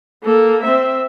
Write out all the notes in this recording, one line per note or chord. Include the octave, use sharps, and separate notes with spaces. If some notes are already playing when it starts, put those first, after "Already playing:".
A#3 A4
C4 E5